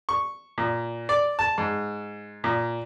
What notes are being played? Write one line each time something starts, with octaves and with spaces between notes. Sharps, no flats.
C#6
A#2
D5
A5
G#2
A#2